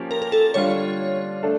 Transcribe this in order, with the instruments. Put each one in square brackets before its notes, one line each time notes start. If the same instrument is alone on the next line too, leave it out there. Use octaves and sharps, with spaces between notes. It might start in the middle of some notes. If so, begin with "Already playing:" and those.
Already playing: [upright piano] F3 A#3 C#4 G4
[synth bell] A#4
A#4
A4
[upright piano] D3 G3 D4 F4 [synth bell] C#5
[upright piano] A3 D4 A4